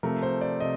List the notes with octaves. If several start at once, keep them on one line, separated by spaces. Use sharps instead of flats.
C3 F3 A3 A#4
C5
D5
C3 D#5